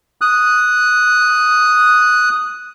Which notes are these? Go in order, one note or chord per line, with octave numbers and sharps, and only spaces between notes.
D#6 F#6